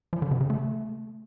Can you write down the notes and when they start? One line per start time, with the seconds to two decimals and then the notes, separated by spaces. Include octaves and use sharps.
0.13 F3
0.22 D3
0.31 C3
0.41 C#3
0.50 A3